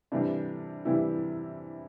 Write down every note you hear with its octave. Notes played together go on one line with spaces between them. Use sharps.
C3 E3 G3 D4
C3 E3 G3 E4